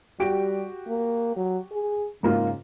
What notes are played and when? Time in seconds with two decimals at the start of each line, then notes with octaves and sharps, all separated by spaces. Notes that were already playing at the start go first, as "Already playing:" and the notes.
0.20 G3 F#4 G4 D7
0.88 A#3
1.37 F#3
1.72 G#4
2.23 G#2 C#3 A#3 F4